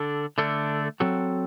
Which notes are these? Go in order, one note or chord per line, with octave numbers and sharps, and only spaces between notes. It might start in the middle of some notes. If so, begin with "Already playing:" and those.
Already playing: D3 D4 A4
D3 A3 D4 A4
F#3 C4 F#4 A4